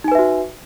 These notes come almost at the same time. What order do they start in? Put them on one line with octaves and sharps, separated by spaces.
D#4 G#5 B4 E5 F#4